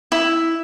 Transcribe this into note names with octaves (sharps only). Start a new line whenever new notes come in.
E4